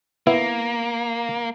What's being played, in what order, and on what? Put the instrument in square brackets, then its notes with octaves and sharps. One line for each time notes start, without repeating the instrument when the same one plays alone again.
[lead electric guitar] A#3 [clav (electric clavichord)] B3 E4